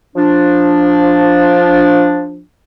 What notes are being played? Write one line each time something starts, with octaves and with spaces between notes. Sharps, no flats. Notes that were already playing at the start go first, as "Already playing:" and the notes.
F3 D4